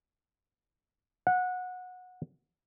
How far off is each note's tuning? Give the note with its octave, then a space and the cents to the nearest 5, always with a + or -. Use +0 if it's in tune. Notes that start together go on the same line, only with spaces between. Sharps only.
F#5 -20